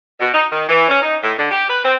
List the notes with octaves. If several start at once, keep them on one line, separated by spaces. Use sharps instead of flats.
B2
D#4
D#3
E3
C#4
D#4
A2
D3
G4
B4
C4